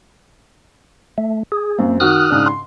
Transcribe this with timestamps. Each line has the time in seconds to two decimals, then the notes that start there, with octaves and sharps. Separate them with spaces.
1.18 A3
1.52 G#4
1.79 F#2 A#3 C4
2.00 D#3 F#4 D#6 F6 F#6
2.30 G#2 C#3 D4
2.46 C6